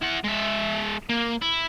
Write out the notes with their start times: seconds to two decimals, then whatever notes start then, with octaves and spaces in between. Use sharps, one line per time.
0.01 E4 F#5
0.24 G#3 E5
1.09 A#3
1.42 E4